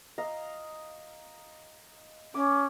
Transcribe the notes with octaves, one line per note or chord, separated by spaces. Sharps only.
D#5 F5 A#5
C#4 D6